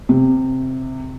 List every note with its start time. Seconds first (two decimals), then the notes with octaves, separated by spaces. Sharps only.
0.09 C3